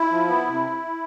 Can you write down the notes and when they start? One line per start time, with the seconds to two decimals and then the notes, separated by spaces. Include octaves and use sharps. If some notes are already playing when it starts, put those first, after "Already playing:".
Already playing: E4
0.11 F3
0.29 B3
0.47 C3